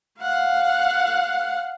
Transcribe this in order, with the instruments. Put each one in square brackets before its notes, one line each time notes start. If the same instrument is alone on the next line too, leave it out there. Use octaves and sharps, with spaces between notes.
[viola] F5 F#5